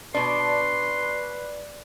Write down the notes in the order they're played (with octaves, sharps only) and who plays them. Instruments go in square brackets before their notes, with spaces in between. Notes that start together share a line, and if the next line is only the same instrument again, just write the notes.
[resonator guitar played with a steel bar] B2 D4 [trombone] B4 [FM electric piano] D5 [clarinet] C6